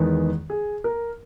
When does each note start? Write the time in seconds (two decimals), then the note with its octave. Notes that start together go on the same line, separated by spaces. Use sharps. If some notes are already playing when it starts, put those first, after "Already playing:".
Already playing: E2 D#3 G#3 B3
0.50 G#4
0.84 A#4